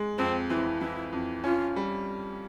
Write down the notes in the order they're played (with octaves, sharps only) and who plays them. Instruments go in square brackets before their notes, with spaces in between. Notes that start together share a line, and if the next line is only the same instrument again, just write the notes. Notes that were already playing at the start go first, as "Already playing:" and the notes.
Already playing: [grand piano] G#3
[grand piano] F2 [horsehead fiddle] C4
[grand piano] E3 [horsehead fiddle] C4
[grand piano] E3 [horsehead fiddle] E4
[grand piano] F2
[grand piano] C#4 [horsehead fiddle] F4
[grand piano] G3